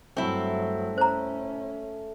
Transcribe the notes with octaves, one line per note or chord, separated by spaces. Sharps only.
G2 F#3 A3 C4 E4
C#4 C5 A#5